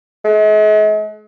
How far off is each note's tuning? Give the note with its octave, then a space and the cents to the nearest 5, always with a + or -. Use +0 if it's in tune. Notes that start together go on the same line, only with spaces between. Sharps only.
G#3 +45